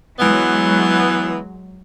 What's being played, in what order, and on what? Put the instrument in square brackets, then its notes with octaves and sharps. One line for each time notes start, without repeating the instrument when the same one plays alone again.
[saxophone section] E3 B3 [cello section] F#3 G#3